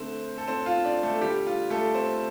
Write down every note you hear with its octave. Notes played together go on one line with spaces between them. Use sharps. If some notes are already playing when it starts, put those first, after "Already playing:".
Already playing: D3 A3 C4 C5
A4
C4 C5
F4 F5
D4 D5
A3 A4
D3 G3 G4
F4
A3 A4
C4 C5